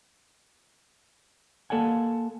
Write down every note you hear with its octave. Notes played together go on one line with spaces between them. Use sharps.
A#3 A4 D5 F#5 G#5